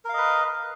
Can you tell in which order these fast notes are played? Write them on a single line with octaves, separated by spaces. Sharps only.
A#4 F5 D#5 B4